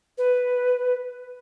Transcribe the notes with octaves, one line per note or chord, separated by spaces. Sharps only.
B4